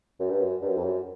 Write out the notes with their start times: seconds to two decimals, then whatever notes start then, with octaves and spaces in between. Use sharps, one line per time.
0.20 F#2
0.30 G2
0.41 F#2
0.62 G2
0.69 F#2
0.77 F2
0.85 F#2